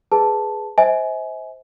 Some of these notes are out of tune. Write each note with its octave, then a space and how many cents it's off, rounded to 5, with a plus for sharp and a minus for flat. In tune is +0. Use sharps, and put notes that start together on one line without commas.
G#4 +0 B4 +0 A5 +0
C5 +0 E5 -45 G#5 +20